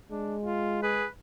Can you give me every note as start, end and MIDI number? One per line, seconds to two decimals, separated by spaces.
0.11 1.06 56
0.11 0.35 62
0.45 0.83 65
0.83 1.05 68
0.83 1.07 71